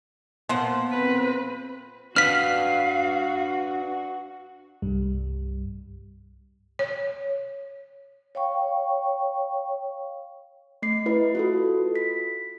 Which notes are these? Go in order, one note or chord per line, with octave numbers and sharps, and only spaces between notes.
A#2 F3 B3 C5 F#5
C4 B4
D4 F#4 B4 F5 F6 B6
C2 G2 G3
C#5
C#5 F5 G5 C#6
A3 C7
E4 B4 D#5
F4 F#4 A4
B6